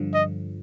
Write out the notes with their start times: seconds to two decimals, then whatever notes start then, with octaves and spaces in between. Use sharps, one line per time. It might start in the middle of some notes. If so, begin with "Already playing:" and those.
Already playing: G2 D3 F3
0.14 D#5